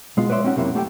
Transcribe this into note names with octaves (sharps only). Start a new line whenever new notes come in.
B2 G#3 B3 F4
B4 C#5 D5 E5 C6
C4 C#4 D#4 F#4 F#5
F2 C3 F#3 A#3 E4
A3 G4 A4 F5 G5